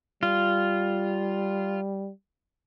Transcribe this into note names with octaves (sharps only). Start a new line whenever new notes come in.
G3 F4